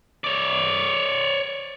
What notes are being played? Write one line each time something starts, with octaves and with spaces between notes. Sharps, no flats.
C#5 D5